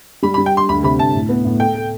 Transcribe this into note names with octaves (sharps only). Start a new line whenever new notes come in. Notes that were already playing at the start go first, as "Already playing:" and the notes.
G3 B5
B5
G3
G5
D4 C6
D2 B5
C3 B5
D2 A5
A2
B3
A2
A4 G5
A4